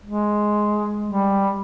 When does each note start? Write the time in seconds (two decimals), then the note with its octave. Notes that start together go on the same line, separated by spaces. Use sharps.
0.05 G#3
1.06 G3